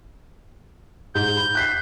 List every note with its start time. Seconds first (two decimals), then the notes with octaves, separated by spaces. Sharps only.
1.15 G#2 G6
1.37 B5
1.55 F#6 B6 C7